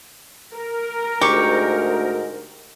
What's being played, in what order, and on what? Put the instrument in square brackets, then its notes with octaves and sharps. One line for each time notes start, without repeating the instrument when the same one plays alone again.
[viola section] A#4
[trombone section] D2 G#2 [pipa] G4 [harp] C#6 C#7